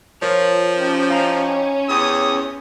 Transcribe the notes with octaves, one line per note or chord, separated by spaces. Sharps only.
F3 F4 A#4 C#5
C#4 D#4 G4
D#4 E4 G4 F5 A#5
E2 G4 C#5 D#6